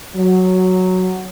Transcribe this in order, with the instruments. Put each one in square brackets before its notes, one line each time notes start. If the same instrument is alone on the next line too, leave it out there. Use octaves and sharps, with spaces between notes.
[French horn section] F#3